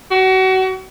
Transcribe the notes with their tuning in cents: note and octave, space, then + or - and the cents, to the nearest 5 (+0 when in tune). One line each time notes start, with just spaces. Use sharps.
F#4 +30